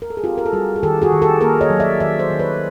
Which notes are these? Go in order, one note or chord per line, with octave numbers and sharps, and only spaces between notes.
A#4
A4
G#4
C4 F4 G4
A#4
A4
G3 F#4 G#4
G#4
D#3 G4 A4
F#4 G#4
D#3
G4 A4
A#3 G#4 A#4
C#5 D#5
F#3
D5 E5
D#3 D5 E5
C5 D5
D#3
B4 C#5